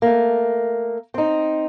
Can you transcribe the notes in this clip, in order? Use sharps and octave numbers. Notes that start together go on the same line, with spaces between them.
A3 A#3
C4 D#4